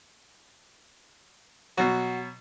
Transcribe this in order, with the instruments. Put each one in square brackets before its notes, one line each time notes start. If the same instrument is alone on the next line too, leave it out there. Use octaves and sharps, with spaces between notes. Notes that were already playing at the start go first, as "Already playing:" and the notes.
[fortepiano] B2 F#3 [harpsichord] F#4